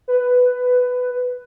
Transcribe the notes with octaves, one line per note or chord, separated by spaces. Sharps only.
B4